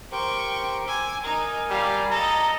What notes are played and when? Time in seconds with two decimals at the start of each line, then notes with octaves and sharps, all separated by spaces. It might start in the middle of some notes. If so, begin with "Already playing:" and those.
0.12 G4 A#4 C5 G5 C#6
0.87 G#5 D6 E6
1.24 D#4 A#4 G#5
1.70 G3 F5
2.11 A4 D#5 A#5